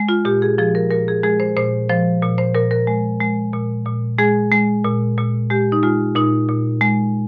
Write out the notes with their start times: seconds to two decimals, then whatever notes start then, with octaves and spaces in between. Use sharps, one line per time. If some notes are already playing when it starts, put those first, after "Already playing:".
Already playing: G#3
0.09 F4
0.25 A#2 G4
0.42 G#4
0.58 F3 G#4
0.75 A#4
0.91 A#2 A#4
1.08 G#4
1.23 G#3 G#4
1.40 C5
1.57 A#2 C5
1.89 F3 C5
2.23 A#2
2.38 C5
2.55 A#2 A#4
2.71 A#4
2.87 G#3
3.21 G#3
3.53 A#2
3.86 A#2
4.19 G#3 G#4
4.52 G#3
4.85 A#2
5.18 A#2
5.50 G#3 G4
5.72 D#4
5.83 G#3 F4
6.15 A#2 D#4
6.49 A#2
6.81 G#3